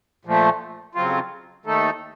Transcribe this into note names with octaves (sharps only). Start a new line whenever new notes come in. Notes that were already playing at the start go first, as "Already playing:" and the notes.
A#2 F3 A3
F2 C#3 F#3 C4 F4
D#2 D#3 A3 D#4 A4